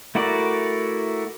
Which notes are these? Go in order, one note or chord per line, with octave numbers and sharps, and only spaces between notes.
A3 E4 F#4 A#4 D5